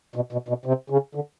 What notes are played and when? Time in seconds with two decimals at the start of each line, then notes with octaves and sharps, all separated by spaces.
0.16 B2
0.32 B2
0.48 B2
0.65 C3
0.90 C#3
1.15 D3